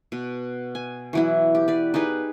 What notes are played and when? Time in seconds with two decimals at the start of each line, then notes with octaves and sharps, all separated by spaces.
0.12 B2
0.75 G#5
1.13 E3 F#3 E4
1.55 G4
1.68 B4 D5
1.94 D#4 G4 G#4 B4